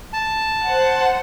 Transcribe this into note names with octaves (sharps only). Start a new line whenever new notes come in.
A5
C5 F#5